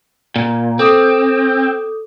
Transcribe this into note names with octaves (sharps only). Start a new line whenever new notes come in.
A#2
C4 A4 D6 D#6